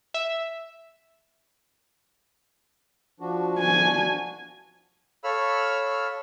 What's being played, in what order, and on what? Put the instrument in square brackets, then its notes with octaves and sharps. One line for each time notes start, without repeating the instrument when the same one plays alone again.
[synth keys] E5
[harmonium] F3 D4 F#4
[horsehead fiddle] G#5
[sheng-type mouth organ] A4 C#5 F5 B5 E6 F6